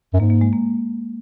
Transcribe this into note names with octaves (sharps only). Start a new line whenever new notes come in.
F#2
G#2 A#3
A#3
G#3
A#3